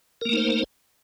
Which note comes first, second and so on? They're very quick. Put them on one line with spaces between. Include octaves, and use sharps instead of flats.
A#4 A#3 A3 D#4 C5